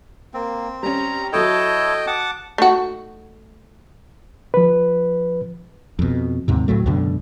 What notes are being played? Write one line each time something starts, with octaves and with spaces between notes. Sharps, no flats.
A#3 C4
G3 C#4 A#5
F#3 E4 A4 C#5 D#5 G5 A5
F#5 A5 D6
A3 D#4 F#4
F3 B4
F2 B2
D#2 G#2 C3
C#2 A2 F#3 A3
C#2 F#2 B2 D3